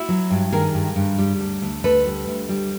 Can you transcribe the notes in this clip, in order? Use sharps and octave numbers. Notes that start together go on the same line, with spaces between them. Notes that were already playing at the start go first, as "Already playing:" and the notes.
Already playing: E4 F#4
F#3
G2
D#3 G#4 A#4
G2
G2
G3
D2
D2
D2 A4 B4
G3
D2
G3